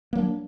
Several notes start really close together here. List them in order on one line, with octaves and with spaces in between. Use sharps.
A#3 F#3 D4